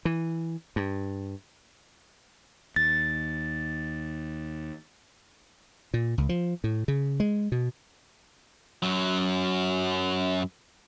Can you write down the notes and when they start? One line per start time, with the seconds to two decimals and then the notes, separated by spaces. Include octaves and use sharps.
0.05 E3
0.76 G2
2.76 D#2 A6
5.94 A#2
6.18 C#2
6.29 F3
6.64 A2
6.88 C#3
7.20 G#3
7.52 B2
8.83 F#2 F#3